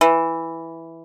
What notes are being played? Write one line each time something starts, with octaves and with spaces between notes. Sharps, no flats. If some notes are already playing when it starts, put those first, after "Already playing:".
E3